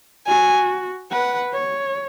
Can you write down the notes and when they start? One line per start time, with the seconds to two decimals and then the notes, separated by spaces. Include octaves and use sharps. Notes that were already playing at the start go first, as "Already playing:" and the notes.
0.27 F#4 G#5
1.11 B4 F#5
1.53 C#5